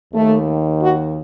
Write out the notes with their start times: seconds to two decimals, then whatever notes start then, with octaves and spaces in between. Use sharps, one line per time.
0.13 D#2 D#3 A3
0.82 F#4